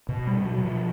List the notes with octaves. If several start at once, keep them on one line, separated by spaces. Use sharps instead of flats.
B2
G3
B2
F#3
B2
F3